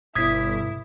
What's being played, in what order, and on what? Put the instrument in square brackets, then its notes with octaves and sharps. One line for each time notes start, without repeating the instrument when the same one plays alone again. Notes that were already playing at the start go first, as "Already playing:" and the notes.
[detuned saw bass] G1 [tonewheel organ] G2 B2 [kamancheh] E4 [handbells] D#6 G#6 B6